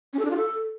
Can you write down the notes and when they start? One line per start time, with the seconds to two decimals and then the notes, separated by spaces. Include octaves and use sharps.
0.13 C#4
0.19 A4
0.25 D4
0.31 F4
0.36 A4